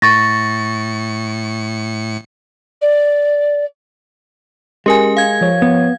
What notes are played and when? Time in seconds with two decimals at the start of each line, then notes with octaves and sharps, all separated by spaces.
0.02 A2 C#6 A6 A#6 C#7
2.81 D5
4.86 G#3 C#4 G4 A#4 G#5
5.17 F5 G#6
5.41 F3 C#5
5.62 B3